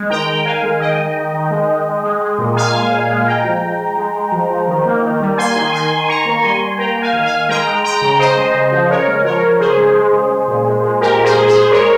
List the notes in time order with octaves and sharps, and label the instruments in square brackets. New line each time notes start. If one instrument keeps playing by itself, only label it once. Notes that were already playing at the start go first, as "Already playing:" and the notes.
Already playing: [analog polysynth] G#3
D#3 G5 A#5
D#3
D#3 F5 G#5
G#3
D#3 D#5 G5
D#3
D#3
D#3
G#3
G#3
G#3
G#3
G#3
A#2
A#2 F5 G#5
G#3
A#2
G#3
G#3 G5 A#5
F3
G#3
G#3
G#3
G#3
F3
F3
D#3
A#3
D#3
G3
A#3 G#5 C6
D#3
D#3 G#5 C6
D#3
D#3 A#5 C#6
A#3
G3 G#5 C6
G3
A#3 G5 A#5
A#3
F5 G#5
D#3
F5 G#5
D#3
G#3 G5 A#5
G#3
G#3 G5 A#5
C#3
C#3 C5 D#5
G#3
C#3
F3
C#3 A#4 C#5
G#3
F3 A#4 C#5
F3
C#3 G#4 C5
G#3
G#3
C#3
G#3
A#2
G#3
G#3
A#2 G4 A#4
A#2
G#4 C5
G#3
G#4 C5
G#3
G#3 A#4 C#5